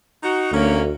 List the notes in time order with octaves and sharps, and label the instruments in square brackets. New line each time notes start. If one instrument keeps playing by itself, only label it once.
[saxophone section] D#4 F#4
[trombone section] D2 [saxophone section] F#3 A#3 C#4